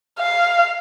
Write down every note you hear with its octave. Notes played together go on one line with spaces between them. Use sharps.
F5